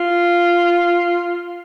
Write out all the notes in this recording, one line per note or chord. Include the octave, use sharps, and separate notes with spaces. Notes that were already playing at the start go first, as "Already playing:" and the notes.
Already playing: F4